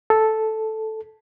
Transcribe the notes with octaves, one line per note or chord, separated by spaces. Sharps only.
A4